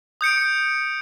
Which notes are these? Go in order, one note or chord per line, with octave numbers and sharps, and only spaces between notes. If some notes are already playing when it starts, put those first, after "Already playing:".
D#6 G6 C#7 D7